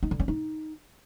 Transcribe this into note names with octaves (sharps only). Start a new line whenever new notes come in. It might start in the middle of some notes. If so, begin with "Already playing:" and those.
D#4
D3
C#4
D#4